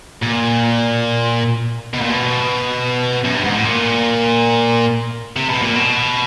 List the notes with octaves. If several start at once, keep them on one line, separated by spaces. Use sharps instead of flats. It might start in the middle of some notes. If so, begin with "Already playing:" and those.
A#2
B2
A#2
B2
F#2
G2
G#2
A2
A#2
C3
B2
A#2
B2